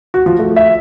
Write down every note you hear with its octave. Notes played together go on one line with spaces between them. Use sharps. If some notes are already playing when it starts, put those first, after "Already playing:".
F#4
F3
A3
E5